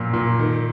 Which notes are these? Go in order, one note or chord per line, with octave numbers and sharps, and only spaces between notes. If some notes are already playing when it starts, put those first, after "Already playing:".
Already playing: F#2 A#2 F3
A#2
D#3